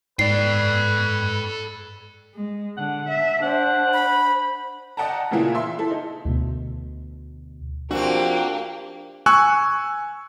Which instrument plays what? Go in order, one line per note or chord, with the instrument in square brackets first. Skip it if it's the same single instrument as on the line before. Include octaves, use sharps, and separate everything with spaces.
[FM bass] G#2 [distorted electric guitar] A4 G5 [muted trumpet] B4 [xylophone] D5 C7
[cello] G#3
[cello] D3 [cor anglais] F#5
[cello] E5
[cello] D4 [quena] C5 [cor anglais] F#5
[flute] B5
[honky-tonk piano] D5 D#5 F#5 G5 A5 A#5
A#2 C#3 E3 A#3 E4 F4
E5 C6
E4 A4
D#4
[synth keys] D2 B2
[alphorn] F3 [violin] A#3 G4 [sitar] C4 F#4 [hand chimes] D4
[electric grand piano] G#5 C#6 E6 F#6